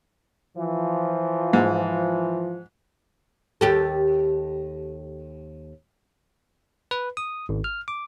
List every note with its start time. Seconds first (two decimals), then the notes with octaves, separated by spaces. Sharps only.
0.57 E3 F3
1.53 G#2
3.61 D#2 G4 A4
6.91 B4
7.17 D#6
7.49 G#1
7.64 F6
7.88 D6